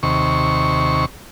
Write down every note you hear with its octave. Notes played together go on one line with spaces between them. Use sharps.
D#2 C3 C#6